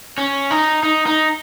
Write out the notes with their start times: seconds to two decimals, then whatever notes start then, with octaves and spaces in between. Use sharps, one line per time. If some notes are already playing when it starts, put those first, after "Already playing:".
0.18 C#4
0.51 D#4
0.83 D#4
1.06 D#4